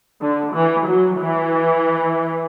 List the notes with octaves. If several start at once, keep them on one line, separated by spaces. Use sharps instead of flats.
D3
E3
F#3
E3